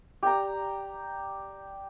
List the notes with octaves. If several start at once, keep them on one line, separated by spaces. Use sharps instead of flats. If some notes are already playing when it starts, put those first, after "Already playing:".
G4 D5 A#5